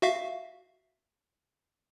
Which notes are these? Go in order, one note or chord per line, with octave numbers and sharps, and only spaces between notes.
F#4 E5 F5